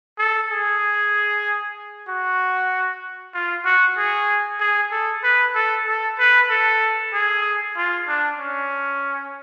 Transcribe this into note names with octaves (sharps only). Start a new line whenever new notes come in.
A4
G#4
F#4
F4
F#4
G#4
G#4
A4
B4
A4
A4
B4
A4
G#4
F4
D4
C#4